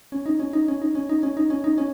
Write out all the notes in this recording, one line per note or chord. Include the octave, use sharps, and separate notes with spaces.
C#4
D#4
C#4
D#4
C#4
D#4
C#4
D#4
C#4
D#4
C#4
D#4
C#4